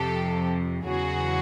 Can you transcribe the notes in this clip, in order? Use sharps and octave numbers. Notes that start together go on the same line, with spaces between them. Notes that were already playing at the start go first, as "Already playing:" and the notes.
Already playing: F2 C3 F3 G4 A4
E2 C#3 F#3 F#4 G#4